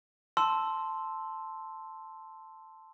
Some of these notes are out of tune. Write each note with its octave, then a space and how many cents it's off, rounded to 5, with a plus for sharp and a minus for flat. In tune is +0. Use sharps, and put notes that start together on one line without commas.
A5 +0 C6 +0 E6 +0